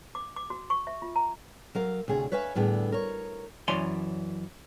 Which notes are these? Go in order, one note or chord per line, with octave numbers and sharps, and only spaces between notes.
D6
D6
F#4
C#6
E5
F4
A#5
F#3 A#4 F5
D2 C3 G#4 C#5
B4 C#5 E5 F5 G#5
A2 D3 G3 B3 G#4
A#4 C#5
F#2 E3 C#5 D5 G#5 C6